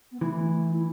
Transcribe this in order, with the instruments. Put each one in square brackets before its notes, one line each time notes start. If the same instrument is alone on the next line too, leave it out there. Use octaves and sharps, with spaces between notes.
[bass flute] B3
[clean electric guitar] E3 [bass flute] A3
[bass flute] A3
E4